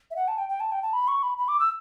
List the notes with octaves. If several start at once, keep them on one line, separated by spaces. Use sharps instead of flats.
E5
F#5
A5
G5
G5
A5
G5
A5
B5
C#6
B5
B5
D6
E6